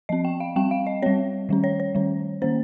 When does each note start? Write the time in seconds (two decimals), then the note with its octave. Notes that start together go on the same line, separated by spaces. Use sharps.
0.09 F3 C4 D#5
0.25 G5
0.40 F5
0.56 G3 C4 G5
0.71 F5
0.87 D#5
1.02 G3 C4 C#5
1.49 D#3 G3 C#4
1.64 C#5
1.80 C#5
1.95 D#3 G3 C#4
2.42 D#3 A#3 C#4 C5